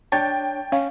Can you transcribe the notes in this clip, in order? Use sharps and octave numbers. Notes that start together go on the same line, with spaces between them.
D4 C#5 G5 A5
C#4 F5